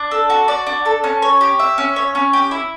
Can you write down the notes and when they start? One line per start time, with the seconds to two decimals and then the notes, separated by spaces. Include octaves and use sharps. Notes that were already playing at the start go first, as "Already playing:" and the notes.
Already playing: D4
0.11 A4
0.30 F#4
0.48 D5
0.66 D4
0.85 A4
1.04 C#4
1.22 C#5
1.41 G4
1.59 E5
1.78 C#4
1.96 C#5
2.15 C#4
2.33 G4
2.51 E4